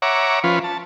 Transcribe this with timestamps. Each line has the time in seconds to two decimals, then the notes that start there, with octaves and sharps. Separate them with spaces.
0.02 C#5 E5 F#5 A#5 D6
0.44 F3 C#4 F4 B4
0.64 A5